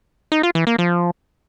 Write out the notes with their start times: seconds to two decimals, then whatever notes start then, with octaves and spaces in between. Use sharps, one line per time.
0.32 D#4
0.43 F4
0.55 E3
0.67 A#3
0.79 F3